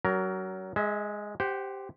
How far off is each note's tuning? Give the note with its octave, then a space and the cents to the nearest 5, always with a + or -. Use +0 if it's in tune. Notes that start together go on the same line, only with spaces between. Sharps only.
F#3 +25 C#4 +30 A#4 +0
G#3 +0 E5 -35
G4 +0 C5 +0 F#5 +30